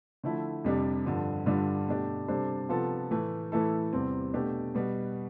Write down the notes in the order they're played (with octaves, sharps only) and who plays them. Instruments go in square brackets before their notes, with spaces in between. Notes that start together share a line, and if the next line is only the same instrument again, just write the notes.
[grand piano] D3 F3 A3 E4
F2 C3 G3 D4
G2 D3 F3
G2 D3 G3 D4 F4
B2 A3 D4 G4
C3 G3 D4 A4 C5
C3 F3 B3 F4 A4
A2 E3 A3
A2 E3 A3 E4 A4
E2 C3 E3 G3 C4
B2 A3 D4 G4 B4
B2 G3 B3